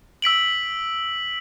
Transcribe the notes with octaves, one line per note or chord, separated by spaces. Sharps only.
E6 B6 D7 F#7